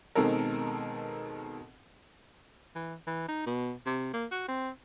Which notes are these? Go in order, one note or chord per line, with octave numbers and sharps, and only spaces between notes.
B2 D#3 G#3 C4 A4 A#4
E3
E3
D#4
B2
C3
A#3
F#4
C4